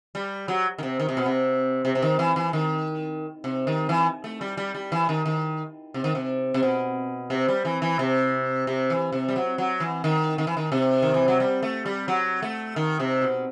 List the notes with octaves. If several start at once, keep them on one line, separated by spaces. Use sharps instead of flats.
G3
F#3
D#3
C3
D#3
C3
B2
C3
C3
C3
D#3
E3
E3
D#3
C3
D#3
E3
A3
G3
G3
G3
E3
D#3
D#3
C3
D#3
C3
C3
B2
C3
G3
E3
E3
C3
C3
E3
C3
G3
F#3
F#3
E3
D#3
D#3
E3
D#3
C3
D#3
E3
F#3
G3
A3
G3
F#3
A3
D#3
C3
B2